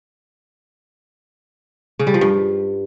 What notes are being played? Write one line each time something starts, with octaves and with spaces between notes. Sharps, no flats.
C#3
G3
F3
G2